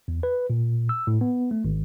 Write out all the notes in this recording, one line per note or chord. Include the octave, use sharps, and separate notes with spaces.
E2
B4
A#2
E6
A2
B3
A3
G#1